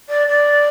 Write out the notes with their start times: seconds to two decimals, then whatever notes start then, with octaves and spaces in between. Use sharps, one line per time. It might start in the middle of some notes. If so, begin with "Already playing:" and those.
0.09 D5
0.28 D5